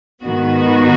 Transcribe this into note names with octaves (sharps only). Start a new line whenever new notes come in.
G#2 D#3 B3 F#4